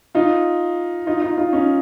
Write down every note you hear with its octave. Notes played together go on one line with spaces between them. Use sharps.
D#4 F4
D#4 F4
D#4 F4
D#4 F4
C#4 D#4